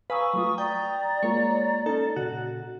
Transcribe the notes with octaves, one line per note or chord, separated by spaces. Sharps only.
B4 F5 G#5 A#5 C#6 D#6 E6
F#3 A3 F4
D5 G5 A#5 D#6
G#3 A#3 F4 C#5
C#4 D#4 A4
A#2 C#3 F#4